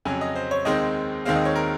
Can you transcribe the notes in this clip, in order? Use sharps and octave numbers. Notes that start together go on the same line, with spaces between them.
F2 C#3 F#3 G#5
D#5
C5
C#5
D#2 D#3 G#3 C4 D#5
D#2 D#3 G#3 C4 F5
D#5
C#5
A#4